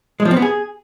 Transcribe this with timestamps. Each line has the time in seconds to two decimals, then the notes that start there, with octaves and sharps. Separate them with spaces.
0.20 G#3
0.25 F3
0.31 C4
0.37 B3
0.42 G#4